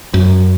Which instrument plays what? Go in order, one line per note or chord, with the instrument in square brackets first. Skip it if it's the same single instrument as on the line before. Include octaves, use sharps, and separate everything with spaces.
[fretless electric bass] F#2